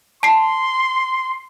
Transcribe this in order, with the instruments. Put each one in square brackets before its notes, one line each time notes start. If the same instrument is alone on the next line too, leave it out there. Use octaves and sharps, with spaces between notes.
[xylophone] A5 C7 [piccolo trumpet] C6